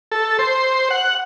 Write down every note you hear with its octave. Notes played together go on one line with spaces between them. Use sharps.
A4
C5
F#5